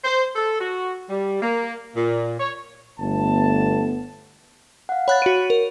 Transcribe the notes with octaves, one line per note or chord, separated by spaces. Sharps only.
C5
A4
F#4
G3
A#3
A#2
C#5
G1 A3 B3 A5
F5 F#5
C#5 F#5 B5 F#6 A6
F#4 C#5 D7 D#7
A#4